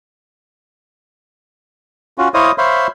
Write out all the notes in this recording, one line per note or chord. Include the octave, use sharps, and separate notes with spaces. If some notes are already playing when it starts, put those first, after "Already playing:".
C#4 F4 F#4
E4 C5 C#5 D#5 F5 D#6
C5 C#5 E5 F5 B5 C6